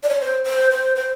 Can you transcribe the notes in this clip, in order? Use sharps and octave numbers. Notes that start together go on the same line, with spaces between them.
D5
C#5
C5
C5
C5
C5